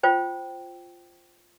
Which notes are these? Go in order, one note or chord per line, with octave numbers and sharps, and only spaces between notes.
F4 C5 G5